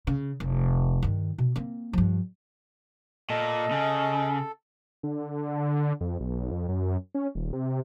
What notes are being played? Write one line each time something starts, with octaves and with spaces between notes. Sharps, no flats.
C#3
F1
G2 D#3
B2
A#3 C4
G2 F3
A#2 A4 D#5
C#3
D3
F2
B1
F2
F#2
C#4
D#1
C3